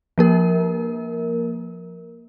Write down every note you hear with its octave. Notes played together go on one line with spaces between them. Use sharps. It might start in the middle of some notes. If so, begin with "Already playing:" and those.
F3 A#3 A#4